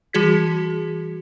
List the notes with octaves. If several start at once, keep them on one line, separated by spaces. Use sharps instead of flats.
E3 G3 F#4 G#4 G#6 B6